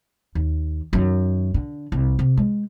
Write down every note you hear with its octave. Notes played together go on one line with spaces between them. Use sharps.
D#2
F#2 D#3
D3
C2
C3
G#3